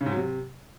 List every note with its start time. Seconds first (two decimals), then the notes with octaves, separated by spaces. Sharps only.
0.01 C#3
0.06 G#2
0.11 F#3
0.17 C3